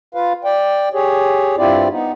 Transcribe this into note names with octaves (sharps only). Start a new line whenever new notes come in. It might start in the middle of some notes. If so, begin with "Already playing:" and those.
F4 B4 F5
D5 G5
G4 G#4 C#5
G2 C4 E4 F4 G4 D5
B3 D#4